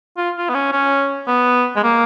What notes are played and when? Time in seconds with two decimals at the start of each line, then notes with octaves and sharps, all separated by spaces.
0.17 F4
0.37 F4
0.49 B3
0.54 C#4
0.72 C#4
1.27 B3
1.76 G#3
1.83 A#3